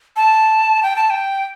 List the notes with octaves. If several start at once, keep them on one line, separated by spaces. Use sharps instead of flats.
A5
G5
A5
G5